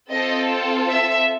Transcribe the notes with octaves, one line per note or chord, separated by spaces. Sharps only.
C4 F4 A4 D#5
E5